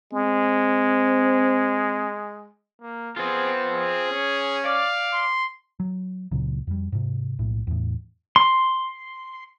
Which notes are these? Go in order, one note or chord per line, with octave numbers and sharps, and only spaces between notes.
G#3 C4
A#3
B3 C4 F4 G#4
G#4
C#4
D5 F5
C6
F#3
C#2 A#2 C#3 F#3
F2 G3
G#2 C3
B1 A2
E2 A2
C6